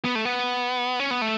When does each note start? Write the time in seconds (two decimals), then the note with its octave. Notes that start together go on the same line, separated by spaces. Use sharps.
0.05 B3
0.15 A3
0.25 B3
1.00 C#4
1.11 B3
1.22 A3